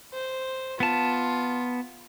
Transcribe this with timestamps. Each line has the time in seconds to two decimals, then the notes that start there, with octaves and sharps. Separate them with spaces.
0.14 C5
0.80 B3 F4 A5